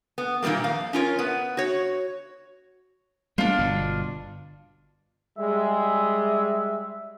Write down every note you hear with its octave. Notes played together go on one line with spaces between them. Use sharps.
B3
A#2 D#3 F3 G3 A#3
F2 F5
C#4 F4 A#4 C#5
B3 B4
F#4 C#5
G3 G#3 B3 D4 F4
G1 B2
G3 G#3 E5